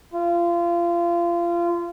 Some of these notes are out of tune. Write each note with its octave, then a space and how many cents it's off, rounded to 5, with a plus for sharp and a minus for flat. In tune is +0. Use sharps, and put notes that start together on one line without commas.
F4 -25